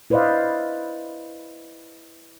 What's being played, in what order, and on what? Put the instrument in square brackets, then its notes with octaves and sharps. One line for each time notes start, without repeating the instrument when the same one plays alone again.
[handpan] E4 B4 C5 D5 D#5 F5